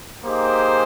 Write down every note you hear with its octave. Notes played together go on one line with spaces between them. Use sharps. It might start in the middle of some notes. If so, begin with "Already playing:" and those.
A#3 D#4 G4 G#4 C5